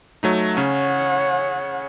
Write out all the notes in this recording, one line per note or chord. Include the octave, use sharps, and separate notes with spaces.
F#3 A3 D#4
C#3 C#4 C#5 F#5